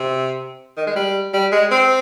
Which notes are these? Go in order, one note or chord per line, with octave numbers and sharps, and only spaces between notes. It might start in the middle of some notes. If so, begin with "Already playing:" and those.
Already playing: C3
D#3
G#3
G3
G3
G#3
C4